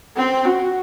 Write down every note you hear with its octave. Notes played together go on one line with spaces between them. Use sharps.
C4
F#4